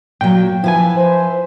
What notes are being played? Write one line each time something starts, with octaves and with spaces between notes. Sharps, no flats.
A#2 F#3 G5
F3 E4 B4 G#5
C5